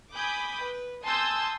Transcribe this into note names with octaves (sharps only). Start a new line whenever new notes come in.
G#5 B5 D6 D#6 G6
B4
G#5 A5 C6 D#6 E6 G6